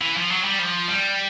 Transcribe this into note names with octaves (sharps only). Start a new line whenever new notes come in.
E3
F3
F#3
G3
F3
G3